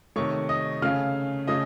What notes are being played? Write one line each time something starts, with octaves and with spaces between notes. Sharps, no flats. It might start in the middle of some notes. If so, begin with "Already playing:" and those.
C3 D#3 A3 C#5 C#6
D#5 D#6
C#3 A3 C#4 F5 F6
C#3 A3 C#4 D#5 D#6